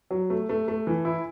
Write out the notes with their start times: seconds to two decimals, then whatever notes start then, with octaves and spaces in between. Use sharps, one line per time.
0.11 F#3
0.30 A3
0.49 A3
0.68 A3
0.87 E3
1.05 E4